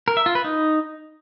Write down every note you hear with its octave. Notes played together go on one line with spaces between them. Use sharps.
A#4
E5
F4
B4
D#4